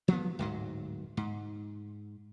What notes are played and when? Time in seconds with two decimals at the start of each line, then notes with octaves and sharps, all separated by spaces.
0.08 F3 F#3 A#3 B3
0.39 D1 G#2 F#3
1.17 G#2